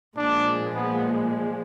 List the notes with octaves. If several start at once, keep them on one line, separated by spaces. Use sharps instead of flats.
A#2 F3 G#3 D4
B3